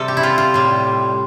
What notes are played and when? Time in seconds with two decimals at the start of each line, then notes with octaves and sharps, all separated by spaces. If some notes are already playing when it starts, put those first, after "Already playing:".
Already playing: C3 G3 A4
0.08 G4
0.17 E4
0.23 F4
0.38 F4
0.54 A2 G3